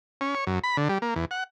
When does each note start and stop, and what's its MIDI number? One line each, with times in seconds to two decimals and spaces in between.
0.21 0.35 61
0.35 0.44 73
0.47 0.59 42
0.64 0.77 83
0.77 0.88 50
0.89 0.98 55
1.02 1.14 58
1.16 1.25 40
1.31 1.44 78